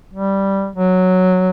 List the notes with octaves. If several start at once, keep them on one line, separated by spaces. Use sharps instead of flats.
G3
F#3